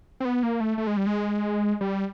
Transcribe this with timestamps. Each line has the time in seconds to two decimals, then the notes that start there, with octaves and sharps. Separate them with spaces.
0.20 C4
0.25 B3
0.43 A#3
0.60 A3
0.78 A3
0.87 G#3
0.97 G3
1.07 G#3
1.81 G3